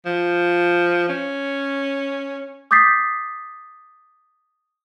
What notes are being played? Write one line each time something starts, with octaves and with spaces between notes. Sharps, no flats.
F3
C#4
D6 D#6 G6 A6 B6 C7